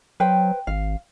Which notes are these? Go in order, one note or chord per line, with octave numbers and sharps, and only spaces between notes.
F#3 B4 C5 G5
G#1 F5